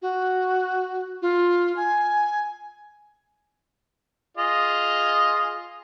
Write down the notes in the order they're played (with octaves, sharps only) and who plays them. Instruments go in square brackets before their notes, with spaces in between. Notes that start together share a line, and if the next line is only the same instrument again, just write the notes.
[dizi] F#4
F4
G#5
[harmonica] F4 G#4 D#5